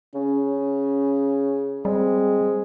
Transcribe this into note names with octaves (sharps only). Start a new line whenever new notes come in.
C#3 C#4
G3 G#3 C4